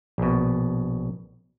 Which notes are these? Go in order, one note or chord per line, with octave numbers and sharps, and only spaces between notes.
A#1 B2